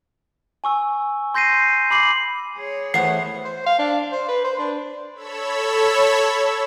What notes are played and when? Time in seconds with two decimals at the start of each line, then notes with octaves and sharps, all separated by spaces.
0.64 G#5 C#6 E6
1.34 C6 G6 A#6 C7 D#7
1.90 B5 D6 C7 F#7
2.56 G#4 C#5
2.94 E3 A3 B3 C5 F#5 C7
3.45 C5
3.66 F5
3.79 D4
4.12 C5
4.29 B4
4.44 C5
4.59 D4
5.15 A4 C#5 B5 E6